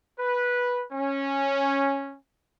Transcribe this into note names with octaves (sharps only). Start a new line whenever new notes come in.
B4
C#4